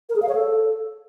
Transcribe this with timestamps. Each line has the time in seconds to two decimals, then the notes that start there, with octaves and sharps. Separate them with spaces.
0.09 A#4
0.16 G#4
0.22 F5
0.29 C#5
0.35 A4